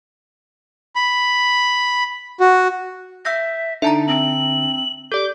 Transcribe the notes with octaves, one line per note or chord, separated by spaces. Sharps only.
B5
F#4
E5 E6 G6 A#6
D3 D#4 E5 A5 A#5
C4 F#7
G4 A4 D5 D6 G6